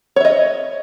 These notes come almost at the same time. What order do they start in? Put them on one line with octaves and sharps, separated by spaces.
C#5 E5 D#5